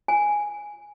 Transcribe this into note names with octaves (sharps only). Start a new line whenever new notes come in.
G#5